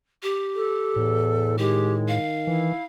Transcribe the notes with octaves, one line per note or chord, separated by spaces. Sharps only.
G4
A4
E2 A2
D#3 G#3 G4
F5
E3 E4